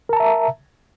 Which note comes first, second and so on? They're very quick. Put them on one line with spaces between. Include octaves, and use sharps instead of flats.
A#4 A5 A#5 E5